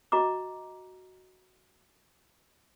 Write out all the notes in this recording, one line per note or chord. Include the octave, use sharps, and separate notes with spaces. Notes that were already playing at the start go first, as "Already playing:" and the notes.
F#4 D#5 A#5 D6